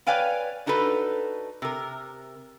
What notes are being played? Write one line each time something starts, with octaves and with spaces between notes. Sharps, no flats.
B4 C#5 D5 F5 G5 G#5
D4 D#4 F#4 A4 B4
C3 A#4